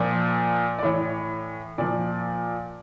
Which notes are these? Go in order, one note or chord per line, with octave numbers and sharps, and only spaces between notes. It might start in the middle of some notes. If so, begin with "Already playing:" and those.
Already playing: A#2 F3 D5
D5
A2 E3 C#5
A#2 F3 D5